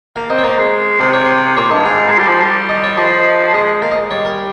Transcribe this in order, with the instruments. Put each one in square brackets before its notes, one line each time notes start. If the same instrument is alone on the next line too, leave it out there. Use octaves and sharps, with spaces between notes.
[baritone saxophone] A#3 [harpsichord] F5
[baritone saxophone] C4 [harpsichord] D#5
[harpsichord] C#5
[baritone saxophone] A#3 [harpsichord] C5
[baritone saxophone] G#3
[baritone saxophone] C3 [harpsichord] C5
[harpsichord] C#5
C5
[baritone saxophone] A#2 [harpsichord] C#5
[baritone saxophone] G2 [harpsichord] D#5
[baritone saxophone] G#2 [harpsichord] F5
[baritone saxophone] G#3
G3
F3
G3
[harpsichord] D#5
C#5
[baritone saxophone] F3 [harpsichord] D#5
[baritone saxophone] G#3 [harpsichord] D#5
[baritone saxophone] A#3 [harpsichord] F5
[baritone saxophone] G#3 [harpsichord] D#5
[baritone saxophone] G3 [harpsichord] C#5
[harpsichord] A#4